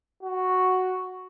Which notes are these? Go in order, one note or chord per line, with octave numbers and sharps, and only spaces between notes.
F#4